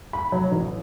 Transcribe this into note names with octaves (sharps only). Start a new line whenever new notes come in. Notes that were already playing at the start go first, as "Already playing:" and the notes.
B5
F#3
A1